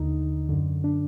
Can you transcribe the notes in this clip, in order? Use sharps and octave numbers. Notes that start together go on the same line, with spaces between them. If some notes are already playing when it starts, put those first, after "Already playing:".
Already playing: D#2 D3 D#4
F#2 D3
D4